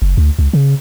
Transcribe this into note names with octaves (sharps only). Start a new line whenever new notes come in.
F#1
D2
C#2
C#3